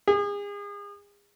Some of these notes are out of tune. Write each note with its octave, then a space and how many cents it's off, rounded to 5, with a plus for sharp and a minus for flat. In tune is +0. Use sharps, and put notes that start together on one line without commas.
G#4 -35